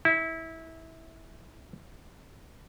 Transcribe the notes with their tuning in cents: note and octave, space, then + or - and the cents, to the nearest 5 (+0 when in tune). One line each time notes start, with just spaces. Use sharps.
E4 -20